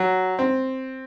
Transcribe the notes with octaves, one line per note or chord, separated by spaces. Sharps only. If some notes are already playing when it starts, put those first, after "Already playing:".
Already playing: F#3
C4